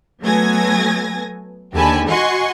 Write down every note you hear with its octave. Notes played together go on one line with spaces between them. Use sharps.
F#3 A3 B3 G#5 G#6 A#6
D#2 D3 G4 G#5 A5 B5
F#4 D#5 F#5 G#5 C6 C#6